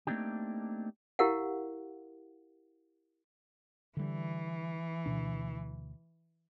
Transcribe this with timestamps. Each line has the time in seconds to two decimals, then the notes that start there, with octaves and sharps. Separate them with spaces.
0.07 A3 A#3 C4 D4 D#4 G4
1.19 E4 G4 A#4 F5 F#5
3.97 D3 E3 G3
5.06 D2 B2 D4